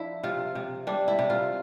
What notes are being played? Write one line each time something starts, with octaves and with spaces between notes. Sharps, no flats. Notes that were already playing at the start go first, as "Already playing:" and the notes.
Already playing: F3 D4 E4
C3 F4
C3
G3 D4
E4
C3
F4